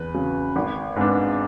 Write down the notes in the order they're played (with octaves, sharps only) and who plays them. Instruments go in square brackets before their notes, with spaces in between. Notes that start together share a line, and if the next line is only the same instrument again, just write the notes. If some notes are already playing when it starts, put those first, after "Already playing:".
Already playing: [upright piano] E2 B4
C#3 F#3
G#1
G#2 G#3 B3 D4